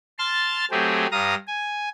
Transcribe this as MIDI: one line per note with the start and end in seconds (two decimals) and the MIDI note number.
0.19 0.65 81
0.19 0.65 84
0.19 0.65 89
0.19 0.65 93
0.71 1.07 54
0.71 1.07 57
0.71 1.07 60
0.71 1.07 67
0.71 1.07 68
1.12 1.35 43
1.12 1.35 77
1.12 1.35 82
1.12 1.35 87
1.12 1.35 94
1.48 1.89 80